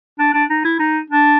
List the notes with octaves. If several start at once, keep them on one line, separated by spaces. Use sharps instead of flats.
D4
D4
D#4
E4
D#4
D4